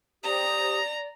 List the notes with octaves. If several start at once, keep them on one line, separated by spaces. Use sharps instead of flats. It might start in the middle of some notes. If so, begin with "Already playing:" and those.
G4 C5 D5 A#5 D#6